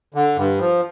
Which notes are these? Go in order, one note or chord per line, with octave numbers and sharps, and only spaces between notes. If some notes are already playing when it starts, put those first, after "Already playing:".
D3
G2
F3